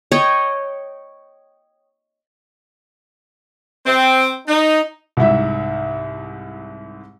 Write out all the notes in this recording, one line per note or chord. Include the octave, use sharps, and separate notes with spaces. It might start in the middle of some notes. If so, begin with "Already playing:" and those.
C#5 D#5 G5 C#6
C4
D#4
C2 G#2 E4 E5